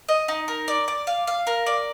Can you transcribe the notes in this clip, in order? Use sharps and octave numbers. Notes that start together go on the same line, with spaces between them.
D#5
D#4
A#4
D5
D5
F5
F5
A#4
D5